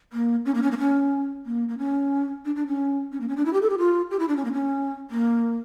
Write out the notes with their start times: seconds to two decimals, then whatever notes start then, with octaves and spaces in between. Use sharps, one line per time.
0.13 A#3
0.45 C#4
0.54 A#3
0.63 C#4
0.71 A#3
0.79 C#4
1.46 A#3
1.68 A#3
1.78 C#4
2.45 D4
2.56 D4
2.67 C#4
3.12 C#4
3.21 A#3
3.28 C#4
3.37 D4
3.45 E4
3.53 G4
3.62 A4
3.70 G4
3.78 F4
4.11 G4
4.19 E4
4.28 D4
4.36 C#4
4.45 A#3
4.53 C#4
5.10 A#3